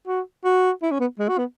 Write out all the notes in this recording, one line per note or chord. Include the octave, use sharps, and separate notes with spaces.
F#4
F#4
E4
C#4
B3
G#3
F#4
B3